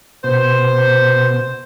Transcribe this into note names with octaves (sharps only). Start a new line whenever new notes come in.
B2 C5